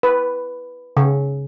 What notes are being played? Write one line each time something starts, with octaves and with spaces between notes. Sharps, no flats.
B4
C#3